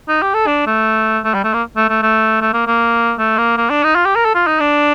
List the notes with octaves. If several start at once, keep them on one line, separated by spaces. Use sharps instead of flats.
D#4
G4
A4
D4
A3
A3
G3
A3
A#3
A3
A3
A3
A3
A#3
A#3
A3
A#3
A#3
D4
D#4
F4
G4
A#4
A4
F4
D#4
D4